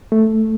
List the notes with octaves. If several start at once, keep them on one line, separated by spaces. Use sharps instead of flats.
A3